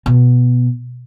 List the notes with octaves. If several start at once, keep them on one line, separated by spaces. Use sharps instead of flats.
B2